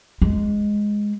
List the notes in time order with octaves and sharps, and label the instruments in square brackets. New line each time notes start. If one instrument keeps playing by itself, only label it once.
[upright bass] G#3